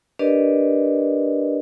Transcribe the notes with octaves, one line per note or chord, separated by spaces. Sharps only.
D4 G4 A#4 B4 D5 D#5